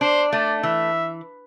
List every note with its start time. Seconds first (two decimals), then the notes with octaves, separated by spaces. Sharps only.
0.01 D4 C5
0.32 A3 D5
0.63 E3 E5